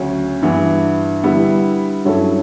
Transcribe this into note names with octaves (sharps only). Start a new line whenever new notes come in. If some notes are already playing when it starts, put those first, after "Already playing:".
Already playing: D2 C#3 F#3 C#4
G2 E3 B3
D3 G3 B3 E4
G2 F#3 C#4 E4 A4